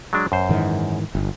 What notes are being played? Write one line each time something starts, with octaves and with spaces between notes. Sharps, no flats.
F#3 G#3 D4
F#2 C5
G#2 D#3 E3
G1